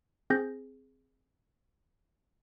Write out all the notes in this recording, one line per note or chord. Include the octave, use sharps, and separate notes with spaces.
C4 G#4 G6 A#6